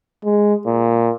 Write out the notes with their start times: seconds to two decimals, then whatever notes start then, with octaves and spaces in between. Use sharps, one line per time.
0.25 G#3
0.66 A#2